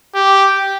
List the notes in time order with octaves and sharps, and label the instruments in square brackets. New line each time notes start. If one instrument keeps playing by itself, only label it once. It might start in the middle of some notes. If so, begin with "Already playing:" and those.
[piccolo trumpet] G4